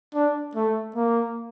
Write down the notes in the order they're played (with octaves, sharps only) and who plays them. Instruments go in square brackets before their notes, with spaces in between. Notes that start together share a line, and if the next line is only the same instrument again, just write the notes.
[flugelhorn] D4
A3
A#3